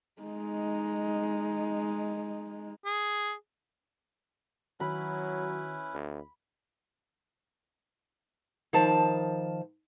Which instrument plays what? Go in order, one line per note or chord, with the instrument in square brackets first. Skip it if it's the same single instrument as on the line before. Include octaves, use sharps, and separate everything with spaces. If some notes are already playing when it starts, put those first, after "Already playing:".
[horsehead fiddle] G#3 D#4
[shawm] G#4
[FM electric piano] D#3 F#4 [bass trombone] F#3 [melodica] C#4 E4 B4 [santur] B5
[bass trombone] D2
[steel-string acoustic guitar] D#3 F3 A5